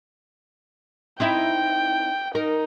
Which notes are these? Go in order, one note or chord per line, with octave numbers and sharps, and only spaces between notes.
C4 D#4 E4 G5
D#4 A#4